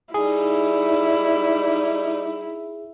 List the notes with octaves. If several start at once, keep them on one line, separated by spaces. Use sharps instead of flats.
G3 D#4 E4 G#4